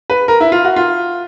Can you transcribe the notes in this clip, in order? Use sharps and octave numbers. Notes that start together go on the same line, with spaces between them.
B4
A#4
E4
F4
F#4
F4